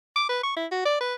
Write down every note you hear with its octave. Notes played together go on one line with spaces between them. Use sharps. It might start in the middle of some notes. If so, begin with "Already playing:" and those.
D6
B4
C#6
E4
F#4
D5
B4